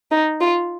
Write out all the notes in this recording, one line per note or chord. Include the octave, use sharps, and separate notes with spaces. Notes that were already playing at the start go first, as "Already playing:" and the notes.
D#4
F4